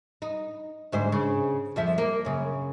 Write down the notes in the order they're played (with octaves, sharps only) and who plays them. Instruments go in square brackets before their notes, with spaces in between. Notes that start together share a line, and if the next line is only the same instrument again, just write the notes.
[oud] D#4
D2 G#2 C5
C#3
F2 F3 E5
A#3
F#2 C#3